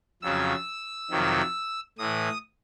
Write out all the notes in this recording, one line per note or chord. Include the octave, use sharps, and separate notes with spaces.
F2 C#3 F#3 E6
F2 C3 D#3 F#3
A2 E3 D#6